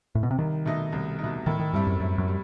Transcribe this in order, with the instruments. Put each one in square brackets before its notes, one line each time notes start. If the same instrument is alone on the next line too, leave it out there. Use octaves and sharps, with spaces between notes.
[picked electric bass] A2
B2
C3
[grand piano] C2 [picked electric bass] D#3
[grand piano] B2 A3 D#4
C2
B2 A3 D#4
[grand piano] A2 [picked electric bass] D#3
[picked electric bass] D#3
[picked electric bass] G2 [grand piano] G3 C4 E4
[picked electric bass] F#2
[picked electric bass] F#2 [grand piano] A2
[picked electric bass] F#2
[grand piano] G3